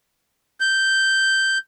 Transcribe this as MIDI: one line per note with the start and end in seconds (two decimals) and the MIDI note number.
0.60 1.58 91